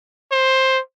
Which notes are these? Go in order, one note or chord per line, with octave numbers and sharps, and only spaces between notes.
C5